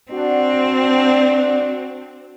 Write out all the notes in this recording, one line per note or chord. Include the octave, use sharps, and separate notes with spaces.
C4 D4 F#4